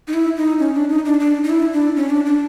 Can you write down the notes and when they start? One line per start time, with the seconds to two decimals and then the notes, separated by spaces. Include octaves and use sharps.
0.08 D#4
0.14 E4
0.37 D#4
0.59 C#4
0.75 D4
0.89 D#4
1.05 D4
1.20 D4
1.44 D#4
1.50 E4
1.73 D4
1.96 C#4
2.10 D4
2.26 D4